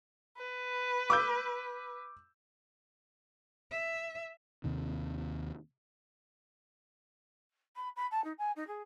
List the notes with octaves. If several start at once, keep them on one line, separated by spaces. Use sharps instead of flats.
B4
D6 E6 G6
E5
D#2 C3 D#3
B5
B5
A5
D#4
G#5
D#4
G#4